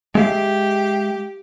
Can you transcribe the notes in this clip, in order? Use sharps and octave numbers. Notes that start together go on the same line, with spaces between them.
G#3 G4 E5 F5